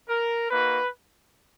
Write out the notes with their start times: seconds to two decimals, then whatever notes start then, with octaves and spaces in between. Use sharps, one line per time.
0.08 A#4
0.50 A#3 D#4 F#4 B4